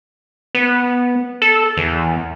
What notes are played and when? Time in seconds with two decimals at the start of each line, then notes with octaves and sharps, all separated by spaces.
0.55 B3
1.42 A4
1.77 E2